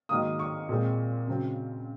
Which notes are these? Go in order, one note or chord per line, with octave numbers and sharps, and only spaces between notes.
G#2 D#3 F#3 A#3 D#6
C#6
A#2 G#3 C4
C#3 F#3 C4